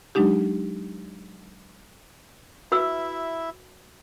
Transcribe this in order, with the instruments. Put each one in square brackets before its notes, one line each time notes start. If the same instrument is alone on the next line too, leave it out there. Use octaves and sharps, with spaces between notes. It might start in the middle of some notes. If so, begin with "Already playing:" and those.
[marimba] F#3 G#3 D4 D#4 G4
[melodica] E4 E5 [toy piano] F#4 B4 E6